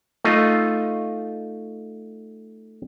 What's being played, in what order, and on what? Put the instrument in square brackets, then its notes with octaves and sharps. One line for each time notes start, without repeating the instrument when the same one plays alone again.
[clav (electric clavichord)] A3 D#4 F4 D#5